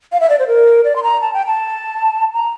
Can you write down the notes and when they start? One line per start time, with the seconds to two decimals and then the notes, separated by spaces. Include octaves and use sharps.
0.12 F5
0.20 E5
0.30 D5
0.39 C5
0.47 A#4
0.84 D5
0.96 C6
1.03 A#5
1.21 A5
1.34 G5
1.46 A5
2.33 A#5